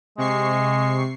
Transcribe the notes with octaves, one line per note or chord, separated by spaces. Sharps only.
C3 G#3 C#6 C7